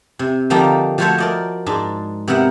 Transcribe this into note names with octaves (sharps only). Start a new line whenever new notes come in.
C3
D3 F3 G3 A#3 D4 D#4
F3 A3 F#4 C5 C#5 E5
A#4 D5 D#5
G#2 D4
C3 B3 A#4 E5 F#5